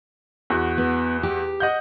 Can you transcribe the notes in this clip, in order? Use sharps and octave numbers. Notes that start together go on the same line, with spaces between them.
E2 F#4
B3
G4
D#5 F#5 G6